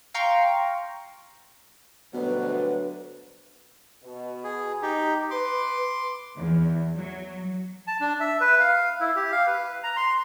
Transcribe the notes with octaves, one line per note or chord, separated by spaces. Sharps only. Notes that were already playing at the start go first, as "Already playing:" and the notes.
F5 G5 A#5 C6 C#6
D2 B2 F#3 G3 D4 B4
B2
G#4
D#4 G4
B4 C6 D6
E2
F#3
A5
D4
E5
B4
F5
E4
G4
F5
B4
A#5
C6